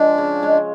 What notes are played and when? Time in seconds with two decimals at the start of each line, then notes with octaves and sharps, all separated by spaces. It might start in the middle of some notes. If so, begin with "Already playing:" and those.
Already playing: F3 G#3 D4
0.18 C#3
0.43 G#3